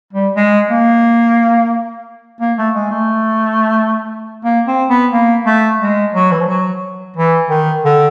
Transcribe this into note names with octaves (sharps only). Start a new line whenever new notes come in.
G3
G#3
A#3
A#3
A3
G#3
A3
A#3
C4
B3
A#3
A3
G#3
F#3
E3
F3
F#3
E3
D#3
D3